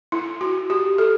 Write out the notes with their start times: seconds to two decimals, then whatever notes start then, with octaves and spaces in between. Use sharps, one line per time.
0.12 E4
0.41 F#4
0.70 G4
0.98 A4